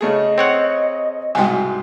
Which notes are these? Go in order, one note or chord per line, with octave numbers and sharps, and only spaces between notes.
C#3 A3 G#4 D#5
C4 C#5 F#5
C2 G#2 B2 G5 G#5